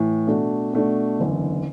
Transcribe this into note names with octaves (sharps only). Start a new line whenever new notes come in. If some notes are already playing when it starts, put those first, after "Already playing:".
Already playing: A2 E3
B2 A3 D4 F#4
B2 A3 D4 F#4
F#1 E2 D3